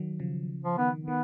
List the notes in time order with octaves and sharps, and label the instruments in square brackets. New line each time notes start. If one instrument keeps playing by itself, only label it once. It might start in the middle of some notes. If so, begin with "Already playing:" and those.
Already playing: [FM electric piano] D#3 F#3
C#3 F3
[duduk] F3
[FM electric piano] D#3 [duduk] B3
[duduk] B3
[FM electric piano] D#3